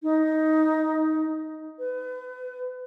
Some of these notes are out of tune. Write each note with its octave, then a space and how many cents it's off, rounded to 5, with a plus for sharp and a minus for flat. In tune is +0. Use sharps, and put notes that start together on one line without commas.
D#4 +10
B4 +35